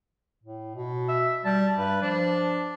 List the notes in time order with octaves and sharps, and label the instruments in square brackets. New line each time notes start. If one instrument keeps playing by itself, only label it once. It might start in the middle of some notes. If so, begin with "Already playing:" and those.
[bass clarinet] A2
B2
[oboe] E5
[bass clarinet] G3 [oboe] A5
[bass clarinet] G2 [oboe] B4
[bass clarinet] F3 [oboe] D4